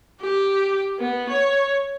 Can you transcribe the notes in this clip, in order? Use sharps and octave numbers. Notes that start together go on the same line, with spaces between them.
G4
B3
C#5